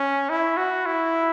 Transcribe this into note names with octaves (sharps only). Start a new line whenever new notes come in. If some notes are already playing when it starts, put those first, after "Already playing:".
Already playing: C#4
E4
F#4
E4